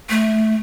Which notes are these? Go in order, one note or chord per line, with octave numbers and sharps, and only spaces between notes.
A3